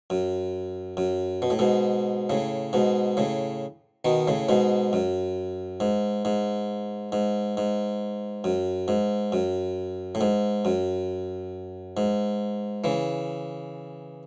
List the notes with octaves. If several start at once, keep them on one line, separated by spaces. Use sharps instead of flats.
F#2
F#2
B2
A2
G#2 B2
A2 C#3
G#2 B2
A2 C#3
B2 D#3
A2 C#3
G#2 B2
F#2
G#2
G#2
G#2
G#2
F#2
G#2
F#2
A2
G#2
F#2
G#2
C#3 E3